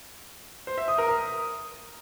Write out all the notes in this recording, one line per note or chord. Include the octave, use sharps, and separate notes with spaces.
C5
E5
D#6
A#4
D#6